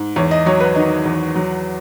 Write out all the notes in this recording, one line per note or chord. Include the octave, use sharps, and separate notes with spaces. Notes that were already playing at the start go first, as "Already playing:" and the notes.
Already playing: G#2
E2 C#5
D#5
F#3 C#5
B4
D#3 D#5
E2
F#3